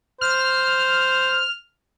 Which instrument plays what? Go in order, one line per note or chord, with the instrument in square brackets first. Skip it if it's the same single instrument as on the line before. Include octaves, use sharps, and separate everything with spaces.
[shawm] C5 [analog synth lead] F6